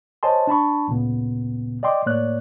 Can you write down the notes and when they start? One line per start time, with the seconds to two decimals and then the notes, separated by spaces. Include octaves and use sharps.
0.23 C5 C#5 D#5 G#5 A5 C6
0.47 D4 A5 B5 C#6
0.87 D2 A#2 C#3 B3
1.83 D5 D#5 G5 C6 D6
2.06 A2 A#3 C#5 D5 F#6